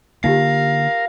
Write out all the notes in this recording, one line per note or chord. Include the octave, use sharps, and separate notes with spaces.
D3 A#3 D#4 F4 G4 A#4 F5